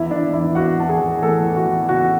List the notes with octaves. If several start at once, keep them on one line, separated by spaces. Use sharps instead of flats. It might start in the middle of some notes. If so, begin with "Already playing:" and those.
Already playing: E2 E4 E5
E2 D4 D5
E2 E4 E5
E3 F#4 F#5
E2 A5
G#4 G#5
E2
E2 A3 A4
E2
F#4
E2
C#3 F#4